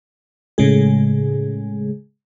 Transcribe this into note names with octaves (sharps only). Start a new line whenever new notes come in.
A2 C#3 G#3 G#4